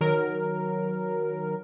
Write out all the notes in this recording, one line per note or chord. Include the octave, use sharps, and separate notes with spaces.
D#3 F#3 A#4